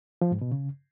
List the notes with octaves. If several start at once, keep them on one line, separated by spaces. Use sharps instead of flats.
F3
G#2
B2
C#3